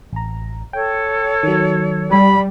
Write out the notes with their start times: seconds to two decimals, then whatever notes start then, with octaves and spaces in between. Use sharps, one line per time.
0.13 A1 A#5
0.73 A4 C#5 G5
1.43 D#3 F#3
2.10 G3 B5